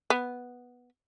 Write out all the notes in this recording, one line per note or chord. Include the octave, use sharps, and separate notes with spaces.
B3